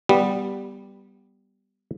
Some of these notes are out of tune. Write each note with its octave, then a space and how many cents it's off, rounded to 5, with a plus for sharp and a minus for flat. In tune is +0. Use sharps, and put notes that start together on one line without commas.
G3 +0 B3 -5